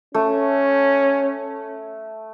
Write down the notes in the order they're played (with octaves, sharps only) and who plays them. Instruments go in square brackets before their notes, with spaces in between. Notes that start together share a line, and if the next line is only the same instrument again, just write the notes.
[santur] A3 [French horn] C#4